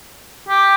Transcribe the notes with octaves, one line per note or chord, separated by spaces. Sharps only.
G4